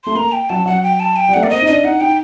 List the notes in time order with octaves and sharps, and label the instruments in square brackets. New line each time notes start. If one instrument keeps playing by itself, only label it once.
[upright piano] A3 [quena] C6
[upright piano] A#3 [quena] A#5
[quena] G5
[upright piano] F#3 [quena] A5
[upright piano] F#3 [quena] F#5
[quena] G5
A5
G5
[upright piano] G3
[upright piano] A3 [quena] F#5
[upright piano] A#3 [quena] D5
[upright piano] C4 [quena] D#5
[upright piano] D#4
[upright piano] D4 [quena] D#5
[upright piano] D#4 [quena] F#5
[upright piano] D#4 [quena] G5